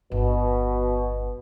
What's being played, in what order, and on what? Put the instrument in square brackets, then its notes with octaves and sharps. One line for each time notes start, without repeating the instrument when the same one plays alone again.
[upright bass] G1 [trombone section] B2